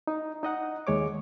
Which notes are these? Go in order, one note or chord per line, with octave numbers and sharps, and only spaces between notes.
D#4
D#4 D#5 F#5
D#2 G#3 C#5 D6